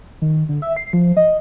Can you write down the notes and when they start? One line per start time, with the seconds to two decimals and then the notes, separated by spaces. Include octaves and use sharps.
0.22 D#3
0.49 D3
0.62 E5
0.77 C7
0.93 F3
1.17 D#5